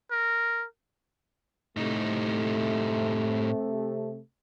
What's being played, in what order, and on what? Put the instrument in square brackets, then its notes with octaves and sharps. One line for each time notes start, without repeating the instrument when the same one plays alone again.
[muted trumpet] A#4
[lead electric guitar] A2 D#4 [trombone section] C3 A3